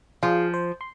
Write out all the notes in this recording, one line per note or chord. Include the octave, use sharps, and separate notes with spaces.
F3 F4 G#4 F5
C5
C6